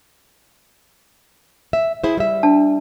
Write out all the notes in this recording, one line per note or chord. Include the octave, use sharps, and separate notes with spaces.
E5
E4 G#4 C5
G3 E5
D4 A5